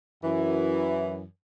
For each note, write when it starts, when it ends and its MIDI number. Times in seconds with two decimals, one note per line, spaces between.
0.24 1.23 42
0.24 1.23 52